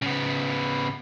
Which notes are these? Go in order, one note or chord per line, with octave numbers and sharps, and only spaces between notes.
C#3 B3